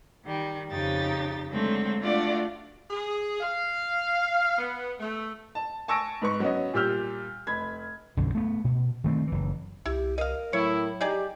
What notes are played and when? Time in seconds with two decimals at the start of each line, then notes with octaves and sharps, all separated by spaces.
0.24 D#3 G3
0.69 F2 C#3 D#4 G4 A6
1.51 D3 F#3 G#3 A3 C4 A4
2.01 A3 D4 F4 F#4 D5
2.90 G#4
3.40 F5
4.58 B3
5.00 A3
5.55 A5
5.88 G#5 A5 C#6 E6 A#6 D7
6.22 G#2 B4 C#6
6.40 F#3 B3 C#4 D#5
6.74 A#2 G3 G4 E6 F6 G6
7.47 F1 B5 G#6
8.17 B1 F#2 D3
8.35 A3 B3
8.64 B2
9.04 D#3 A3 C4
9.27 F#1 E3
9.86 C2 E4 G4
10.18 A#4 D#5 F5
10.53 A2 F#3 E4 C#5
11.01 D#4 G4 G#4 D5